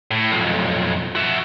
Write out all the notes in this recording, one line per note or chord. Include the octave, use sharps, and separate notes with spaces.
A2
B1 F2
F#4 E5